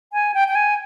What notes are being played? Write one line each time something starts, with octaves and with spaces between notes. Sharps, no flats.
G#5
G5
G5
G#5